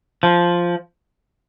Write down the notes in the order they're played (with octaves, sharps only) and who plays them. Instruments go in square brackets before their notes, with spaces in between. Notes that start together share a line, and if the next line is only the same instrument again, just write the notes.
[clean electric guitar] F3